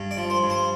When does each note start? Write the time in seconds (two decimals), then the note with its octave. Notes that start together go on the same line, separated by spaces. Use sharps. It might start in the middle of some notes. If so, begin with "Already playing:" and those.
Already playing: G2
0.11 D5
0.17 F3
0.30 C5
0.43 G2
0.50 C5